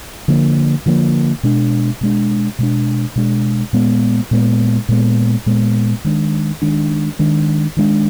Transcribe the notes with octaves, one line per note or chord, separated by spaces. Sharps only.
D3 F3 A#3
D3 F3 A#3
B2 G#3 D4
B2 G#3 D4
B2 G#3 D4
B2 G#3 D4
A#2 G#3 B3
A#2 G#3 B3
A#2 G#3 B3
A#2 G#3 B3
D#3 G#3 D4
D#3 G#3 D4
D#3 G#3 D4
D#3 G#3 D4